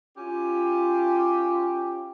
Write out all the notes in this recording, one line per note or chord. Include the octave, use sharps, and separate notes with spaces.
C#4 F4 G4